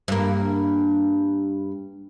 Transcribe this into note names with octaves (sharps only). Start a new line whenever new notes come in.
G2 A#3